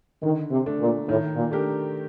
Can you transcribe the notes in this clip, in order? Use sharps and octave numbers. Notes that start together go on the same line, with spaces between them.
D3 D#3
C3
A3 D4
A#2
A2 D#3
A#2
A3 D4 G4 A#4